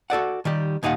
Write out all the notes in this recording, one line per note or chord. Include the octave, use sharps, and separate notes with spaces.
F#4 A4 D5 F#5
D#3 G3 G4
D#2 A#2 D#4 F5 F#5